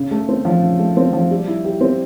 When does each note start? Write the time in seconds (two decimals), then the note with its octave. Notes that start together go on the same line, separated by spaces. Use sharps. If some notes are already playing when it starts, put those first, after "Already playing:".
Already playing: C#3
0.11 A3
0.29 C4
0.45 F3
0.62 C#3
0.79 A3
0.97 C4
1.13 F3
1.31 G3
1.48 E4
1.65 G4
1.81 C4